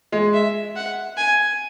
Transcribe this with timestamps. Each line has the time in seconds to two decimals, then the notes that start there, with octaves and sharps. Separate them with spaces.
0.12 G#3
0.34 E5
0.76 F#5
1.17 G#5